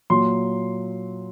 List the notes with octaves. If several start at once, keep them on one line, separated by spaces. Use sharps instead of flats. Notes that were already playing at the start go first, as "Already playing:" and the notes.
A#2 F#3 C6